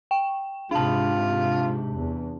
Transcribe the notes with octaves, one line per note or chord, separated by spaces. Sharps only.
G5
G#2 C3 D4 F4 A5
E2